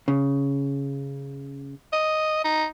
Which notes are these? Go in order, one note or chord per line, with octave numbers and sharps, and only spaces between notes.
C#3
D#5
D#4